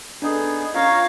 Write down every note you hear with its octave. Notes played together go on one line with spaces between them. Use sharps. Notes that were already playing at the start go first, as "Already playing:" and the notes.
B3 D4 D#4 G#4 A4
C#4 F4 A#4 C#5 F5